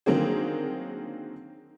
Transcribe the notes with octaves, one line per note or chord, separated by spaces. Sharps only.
D3 D#3 F#3 A#3 C4 G#4